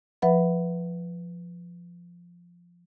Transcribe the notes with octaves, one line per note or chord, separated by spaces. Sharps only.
F3 B4 E5 F#5 B5